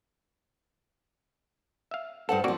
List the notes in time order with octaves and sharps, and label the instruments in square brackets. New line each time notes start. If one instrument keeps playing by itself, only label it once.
[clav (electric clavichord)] E5 F5
[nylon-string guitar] G2 C5 F#5 [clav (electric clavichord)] A4
[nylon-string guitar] F3 C4 [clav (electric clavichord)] A#3 F#4 D5